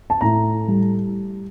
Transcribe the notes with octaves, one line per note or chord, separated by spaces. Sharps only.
A5
A2 A#5
G3